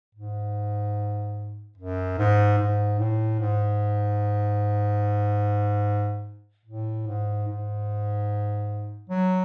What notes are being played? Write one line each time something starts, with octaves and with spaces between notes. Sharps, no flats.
G#2
F#2
G#2
G#2
A2
G#2
A2
G#2
G#2
F#3